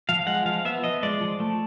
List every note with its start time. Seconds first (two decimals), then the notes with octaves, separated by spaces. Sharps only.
0.09 F3 F5
0.26 G#3 F#5
0.45 F3 F5
0.65 B3 E5
0.84 F3 D#5
1.03 G#3 D5
1.21 F3
1.40 A3